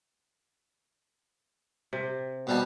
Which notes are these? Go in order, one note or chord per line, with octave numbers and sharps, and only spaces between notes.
C3
B2 G3 A5